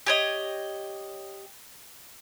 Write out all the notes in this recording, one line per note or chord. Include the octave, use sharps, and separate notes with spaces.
G4 C#5 D#5